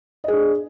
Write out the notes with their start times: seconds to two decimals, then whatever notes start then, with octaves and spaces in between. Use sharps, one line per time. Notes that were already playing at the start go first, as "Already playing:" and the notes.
0.24 D#5
0.28 G#4
0.33 D4